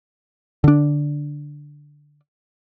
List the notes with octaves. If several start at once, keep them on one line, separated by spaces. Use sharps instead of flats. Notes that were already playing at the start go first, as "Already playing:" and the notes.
D3 D4